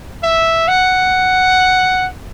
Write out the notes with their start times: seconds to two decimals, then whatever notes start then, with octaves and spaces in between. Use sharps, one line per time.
0.23 E5
0.68 F#5